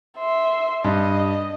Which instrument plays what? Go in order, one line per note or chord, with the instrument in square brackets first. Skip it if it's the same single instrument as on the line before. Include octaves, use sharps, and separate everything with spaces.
[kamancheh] E5 C6
[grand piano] G2 [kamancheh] D#5